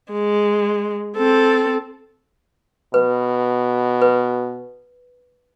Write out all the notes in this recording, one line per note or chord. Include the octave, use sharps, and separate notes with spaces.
G#3
C4 A4
B2 B4
B4